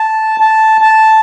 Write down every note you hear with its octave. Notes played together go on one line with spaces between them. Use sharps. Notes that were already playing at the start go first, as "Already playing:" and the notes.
Already playing: A5
A5
A5